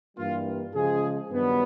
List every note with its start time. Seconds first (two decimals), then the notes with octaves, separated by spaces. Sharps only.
0.17 G2 E3 G3 A#3 F4
0.73 C#3 F3 G#3 G#4
1.29 G2 D#3 F#3 B3 D4